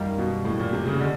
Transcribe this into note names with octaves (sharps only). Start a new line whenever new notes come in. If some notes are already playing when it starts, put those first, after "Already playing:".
Already playing: F#2 D#3 G3 A#3
B2
A2
A#2
C3
C#3
D3 G#3